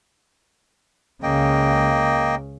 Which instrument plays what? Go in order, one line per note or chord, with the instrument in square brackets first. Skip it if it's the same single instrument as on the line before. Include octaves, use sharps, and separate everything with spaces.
[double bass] C#2 C#3 [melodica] A#3 D#5 G5